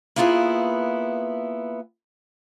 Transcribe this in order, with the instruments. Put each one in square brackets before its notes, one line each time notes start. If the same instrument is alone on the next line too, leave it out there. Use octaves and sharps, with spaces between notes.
[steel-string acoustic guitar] A#3 B3 E4 F4 G#4 B4